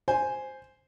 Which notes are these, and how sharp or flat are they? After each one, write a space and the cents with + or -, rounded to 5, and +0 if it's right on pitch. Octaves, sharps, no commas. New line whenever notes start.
C5 +0 G#5 +0